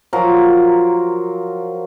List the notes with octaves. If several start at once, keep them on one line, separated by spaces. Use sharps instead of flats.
F3 F#3 A#4